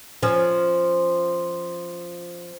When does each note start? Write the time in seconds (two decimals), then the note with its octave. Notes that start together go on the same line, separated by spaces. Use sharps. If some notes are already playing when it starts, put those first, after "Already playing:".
0.23 F3 C#4